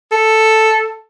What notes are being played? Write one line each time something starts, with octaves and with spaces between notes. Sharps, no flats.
A4